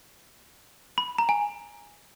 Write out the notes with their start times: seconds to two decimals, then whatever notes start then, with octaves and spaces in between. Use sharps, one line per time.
0.98 B5
1.18 A#5
1.29 G#5